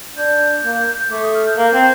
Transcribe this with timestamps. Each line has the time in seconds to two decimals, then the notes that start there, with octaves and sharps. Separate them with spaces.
0.17 D4 G6
0.64 A#3
1.11 A3 D6
1.23 D#6
1.34 F6
1.46 G6
1.57 A#3
1.73 C4